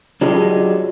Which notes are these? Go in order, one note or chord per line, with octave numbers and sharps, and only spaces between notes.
F#3 D4 F4 G4 G#4 D#5